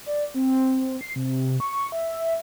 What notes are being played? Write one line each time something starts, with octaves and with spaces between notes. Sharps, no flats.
D5
C4
C7
C3
C#6
E5